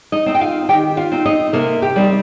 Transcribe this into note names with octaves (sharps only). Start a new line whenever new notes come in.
D#4 D#5
C4 D#4
G5
F4 F5
D#3 G4 G5
F4 F5
C4 D#4
D#4 D#5
C3 A#3 A#4
G4
G3 C4 D#4